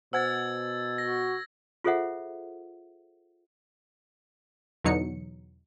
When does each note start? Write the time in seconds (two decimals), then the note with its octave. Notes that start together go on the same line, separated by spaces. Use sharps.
0.13 B2 C5 F#5 G#5 E6 G#6 A6
0.98 F#4 A#6
1.84 F4 G#4 A4 C5 E5 F#5
4.84 E2 B2 D3 F#3 D#4 C#7